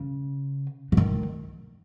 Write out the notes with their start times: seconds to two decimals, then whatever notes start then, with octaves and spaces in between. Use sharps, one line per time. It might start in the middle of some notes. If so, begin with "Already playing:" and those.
Already playing: C#3
0.92 C#3
0.97 D#3